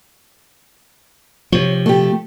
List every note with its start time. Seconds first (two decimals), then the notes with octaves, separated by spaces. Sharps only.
1.52 C3 F3 C#5
1.86 A3 G4